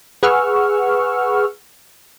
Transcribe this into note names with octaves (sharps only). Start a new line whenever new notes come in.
G#4 B4 F#5 C#6 E6 F6